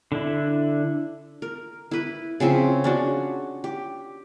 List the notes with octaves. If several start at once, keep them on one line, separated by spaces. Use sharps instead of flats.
D3 D4 E4
A#4
E4 B4
C#3 F3 C4 E5
C#4 D4 F#4
G4